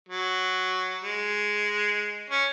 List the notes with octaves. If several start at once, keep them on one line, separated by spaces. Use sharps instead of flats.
F#3
G#3
C#4